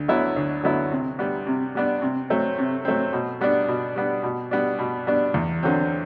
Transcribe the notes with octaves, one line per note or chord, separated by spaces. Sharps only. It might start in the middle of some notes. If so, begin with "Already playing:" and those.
Already playing: D2
D3 F#3 B3 E4
D2
D3 F#3 B3 E4
C3
G3 B3 D4
C3
G3 B3 D4
C3
F#3 A3 C4
C3
F#3 A3 C4
B2
G3 B3 D4
B2
G3 B3 D4
B2
G3 B3 D4
B2
G3 B3 D4
E2
D3 F#3 C4